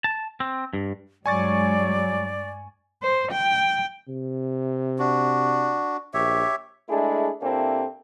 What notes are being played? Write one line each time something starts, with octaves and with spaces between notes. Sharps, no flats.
A5
C4
G2
G2 F#3 G#3 D5 G#5 C#6 A6
C5
G5
C3
D4 F#4
A#1 G4 C#5 E5
G#3 A3 D4 E4 G#4
C3 A#3 C4 D4 E4 A4